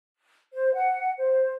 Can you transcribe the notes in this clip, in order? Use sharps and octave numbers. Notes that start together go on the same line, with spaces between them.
C5
F#5
C5